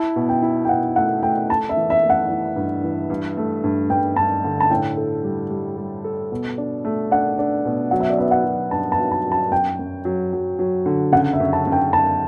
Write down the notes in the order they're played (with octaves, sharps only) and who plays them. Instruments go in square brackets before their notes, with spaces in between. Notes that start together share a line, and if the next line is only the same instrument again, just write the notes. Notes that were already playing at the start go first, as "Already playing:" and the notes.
Already playing: [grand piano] E4 [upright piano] A5
[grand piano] B2
[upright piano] G5
[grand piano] E4
[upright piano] G5
[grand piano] B2 [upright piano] F#5
[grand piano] A3 [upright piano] F#5
[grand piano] A3 [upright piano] G5
[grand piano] A3 [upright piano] A5
[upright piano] E5
[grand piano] E3
[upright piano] E5
[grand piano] A3
[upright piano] F#5
[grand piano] E3
G2
E3
G2
A3
G2
[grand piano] G2 [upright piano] G5
[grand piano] G2 [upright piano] A5
[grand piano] D3
[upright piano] A5
[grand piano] A2 [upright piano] G5
[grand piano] A4
G3
G3
G3
A4
B2
D4
A3
[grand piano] D4 [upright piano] F#5
[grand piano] D4
B2
[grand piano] F#3 [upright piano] F#5
[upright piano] E5
D5
[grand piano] B3 [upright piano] E5
[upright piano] F#5
[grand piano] F#3
[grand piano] G2 [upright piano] A5
[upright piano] A5
[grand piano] F#3
[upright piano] A5
[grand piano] F#3
[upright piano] A5
[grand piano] F#2 [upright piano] G5
[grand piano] F#2
F#3
F#3
F#3
D3
[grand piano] C#3 [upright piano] F#5
[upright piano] E5
[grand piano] F#2
[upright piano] A5
[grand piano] F#2
[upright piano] G5
[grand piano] F#2 [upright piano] A5